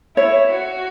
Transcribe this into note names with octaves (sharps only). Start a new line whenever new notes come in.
E4 C#5
F#4